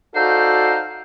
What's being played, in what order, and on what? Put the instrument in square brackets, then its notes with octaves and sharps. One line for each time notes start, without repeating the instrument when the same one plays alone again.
[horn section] D#4 F#4 A4 C5 D5 F5